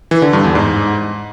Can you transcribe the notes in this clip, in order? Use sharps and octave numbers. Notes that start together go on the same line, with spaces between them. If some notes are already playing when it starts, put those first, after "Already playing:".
E3
D3
G2
E2
G#2